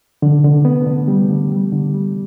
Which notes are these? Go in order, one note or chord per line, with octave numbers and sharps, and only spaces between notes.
D3
D3
B3
D3
G3
D3
G3
D3
G3